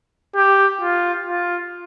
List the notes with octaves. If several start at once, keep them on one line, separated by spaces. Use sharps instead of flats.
G4
F4
F4